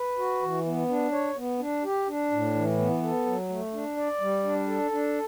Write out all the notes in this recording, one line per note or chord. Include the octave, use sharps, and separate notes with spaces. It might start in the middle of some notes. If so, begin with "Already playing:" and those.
Already playing: B4
F#4
E3
B3
D4
C#5
B3
D4
G4
D4
A2
E3
B3
A4
F#3
A3
D4
D5
G3
D4
A4
D4